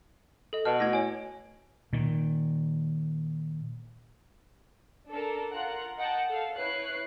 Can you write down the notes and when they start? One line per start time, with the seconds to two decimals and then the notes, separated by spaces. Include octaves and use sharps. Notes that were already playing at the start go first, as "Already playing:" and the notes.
0.53 A4 D#5
0.65 B2 A5 F6
0.80 A3 E4 F#4 G#6 A#6
0.93 C#5 G#5
1.93 A#2 D#3
5.11 D4 A4 A#4
5.54 F4 A#4 F#5 F#6
5.98 D#5 F#5 G5 A5
6.29 A4 F5
6.58 E4 B4 C#5 F#6 C7